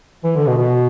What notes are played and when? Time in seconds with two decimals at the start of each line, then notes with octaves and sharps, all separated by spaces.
0.24 E3
0.36 D3
0.47 B2
0.58 B2